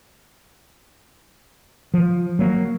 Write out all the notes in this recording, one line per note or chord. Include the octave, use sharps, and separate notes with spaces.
F3
F#3 A#3